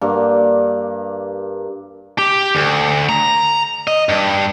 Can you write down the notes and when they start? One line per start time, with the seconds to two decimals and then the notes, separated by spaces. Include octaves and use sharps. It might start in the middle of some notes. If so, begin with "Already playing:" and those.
0.01 G2 A#3
2.18 G4
2.55 D2
3.09 A#5
3.87 D#5
4.09 G2